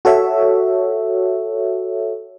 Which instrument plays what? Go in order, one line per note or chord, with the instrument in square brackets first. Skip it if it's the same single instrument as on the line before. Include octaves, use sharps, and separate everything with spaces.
[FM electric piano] F#4 A4 C#5 E5